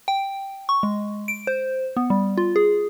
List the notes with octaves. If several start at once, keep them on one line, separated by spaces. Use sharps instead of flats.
G5
C#6
G#3
D7
C5
B3
G3
F4
G#4